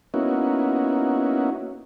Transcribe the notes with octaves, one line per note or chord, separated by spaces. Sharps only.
A#3 B3 C#4 D#4 E4 F#4